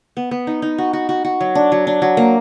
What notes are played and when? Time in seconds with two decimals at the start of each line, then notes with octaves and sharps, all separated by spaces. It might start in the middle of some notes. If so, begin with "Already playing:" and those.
0.17 B3
0.31 B3
0.47 D#4
0.62 D#4
0.78 F#4
0.93 F#4
1.09 F#4
1.25 F#4
1.41 F#3
1.55 D4
1.72 F#3
1.87 D4
2.02 F#3
2.17 A#3